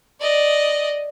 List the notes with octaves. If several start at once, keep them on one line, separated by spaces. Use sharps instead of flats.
D5 D#5